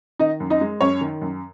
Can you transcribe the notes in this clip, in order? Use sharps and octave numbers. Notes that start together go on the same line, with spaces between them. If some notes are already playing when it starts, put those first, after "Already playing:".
D#3 D#4 D#5
F#2
D#4 D#5
G#3
F#2 C#4 C#5
D#3
F#2